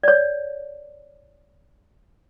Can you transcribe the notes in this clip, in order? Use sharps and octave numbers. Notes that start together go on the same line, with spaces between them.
C#5 D5